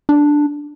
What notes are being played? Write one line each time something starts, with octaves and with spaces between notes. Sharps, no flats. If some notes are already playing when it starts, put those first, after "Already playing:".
D4